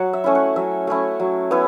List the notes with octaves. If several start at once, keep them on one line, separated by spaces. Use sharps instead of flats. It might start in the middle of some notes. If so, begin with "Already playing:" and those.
Already playing: F#3 F#5
E5
A3 C#4 E4
F#5
F#3 E5
A3 C#4 E4
F#3
B3 E4